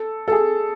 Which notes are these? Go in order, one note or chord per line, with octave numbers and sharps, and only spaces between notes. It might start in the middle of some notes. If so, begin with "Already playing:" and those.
Already playing: A4
A4
G#4